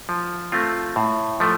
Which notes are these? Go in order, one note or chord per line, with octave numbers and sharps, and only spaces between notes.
F3
A3 C4 F4
A2
F3 A3